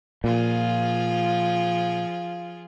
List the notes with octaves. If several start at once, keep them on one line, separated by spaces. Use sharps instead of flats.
A#2 F3 F4 G#4